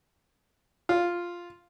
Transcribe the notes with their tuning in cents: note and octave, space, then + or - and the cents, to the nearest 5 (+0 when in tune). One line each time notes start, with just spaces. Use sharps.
F4 +0